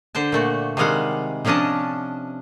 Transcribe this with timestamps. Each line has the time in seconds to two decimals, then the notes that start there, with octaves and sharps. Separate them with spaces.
0.15 D3 C5 G5 A5
0.32 A#2 A3 F#4
0.77 C3 D#3 G3 G#3 F5 F#5
1.45 C3 F3 C#4 D4 D#5 A5